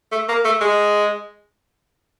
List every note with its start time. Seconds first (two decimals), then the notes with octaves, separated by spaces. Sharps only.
0.12 A3
0.29 A#3
0.45 A3
0.61 G#3